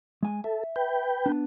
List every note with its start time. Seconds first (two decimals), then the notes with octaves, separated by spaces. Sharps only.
0.23 G#3 G#5
0.44 A4 E5
0.76 B4 G5
1.26 B3 D4